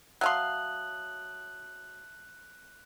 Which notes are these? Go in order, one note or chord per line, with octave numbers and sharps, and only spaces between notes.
F#3 E5 F5 A5 C6 D#6 F#6 F#7